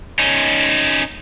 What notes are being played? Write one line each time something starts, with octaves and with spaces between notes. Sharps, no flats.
C#4 D#4